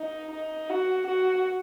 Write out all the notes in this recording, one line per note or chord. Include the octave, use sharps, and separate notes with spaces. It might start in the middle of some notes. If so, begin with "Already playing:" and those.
Already playing: D#4
D#4
F#4
F#4